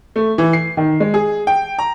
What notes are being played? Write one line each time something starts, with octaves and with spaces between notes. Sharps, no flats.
A3
E3
C7
D#3
G#3
G#4
G5
A#5